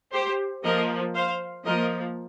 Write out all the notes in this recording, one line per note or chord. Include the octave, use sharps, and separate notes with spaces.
G4 C5
F3 A#3 A#4 D#5
C5 F5
F3 A#3 A#4 D#5